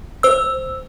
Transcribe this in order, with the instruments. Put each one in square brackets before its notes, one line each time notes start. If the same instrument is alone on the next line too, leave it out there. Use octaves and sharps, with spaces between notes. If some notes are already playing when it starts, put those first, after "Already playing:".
[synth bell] C5 E6